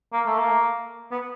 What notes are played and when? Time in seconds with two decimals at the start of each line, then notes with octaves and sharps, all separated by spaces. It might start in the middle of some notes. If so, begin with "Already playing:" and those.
0.12 A#3
0.27 A3
0.38 A#3
1.11 B3